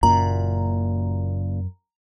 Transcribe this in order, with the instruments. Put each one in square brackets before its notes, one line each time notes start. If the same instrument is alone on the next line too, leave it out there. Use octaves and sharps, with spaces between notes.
[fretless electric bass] F#1 A#2 [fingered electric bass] F#2 [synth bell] A#5